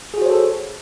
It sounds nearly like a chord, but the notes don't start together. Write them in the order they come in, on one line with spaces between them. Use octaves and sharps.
G#4 F#4 C5 C#5 A4